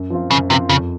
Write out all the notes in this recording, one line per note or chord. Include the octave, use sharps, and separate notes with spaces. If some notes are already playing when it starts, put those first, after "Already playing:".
Already playing: F#2
F3 C4 F4
F#2 C#3
C3 F3 C4 F4
F2 C#3